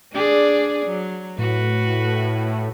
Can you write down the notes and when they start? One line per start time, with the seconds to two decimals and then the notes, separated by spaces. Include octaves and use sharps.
0.12 D4 G#4 D5
0.85 F#3
1.38 A2 F#4 B4